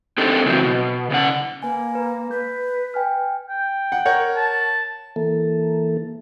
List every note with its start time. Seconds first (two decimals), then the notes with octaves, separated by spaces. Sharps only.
0.18 C4 D4 G4 A4 A#4
0.46 C#3 E3 F#3 C4
0.64 B2
1.10 C#3 C#4 F#5
1.63 A#3 B4 G#5
1.94 B4 A#5
2.31 B4 G6
2.94 G5 G#5 F6
3.49 G5
3.92 F#5
4.06 A#4 C#5 F#5
4.36 A5
5.16 E3 A#3 A4